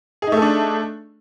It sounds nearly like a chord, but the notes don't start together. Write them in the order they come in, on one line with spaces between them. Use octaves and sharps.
G#4 D#4 A3 A4 D4